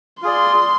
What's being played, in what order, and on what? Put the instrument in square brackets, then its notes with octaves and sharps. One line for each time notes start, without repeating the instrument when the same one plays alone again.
[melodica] F4 G#4 D5 [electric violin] C6